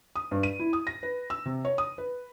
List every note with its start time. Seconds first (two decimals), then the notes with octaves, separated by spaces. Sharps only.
0.16 D#6
0.31 G2
0.43 D#7
0.59 E4
0.73 D#6
0.87 A#6
1.03 B4
1.30 E6
1.45 C3
1.65 C#5
1.78 D#6
1.98 B4